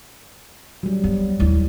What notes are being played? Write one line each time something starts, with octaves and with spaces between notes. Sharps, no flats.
F#3 G3
B3
D#2 E4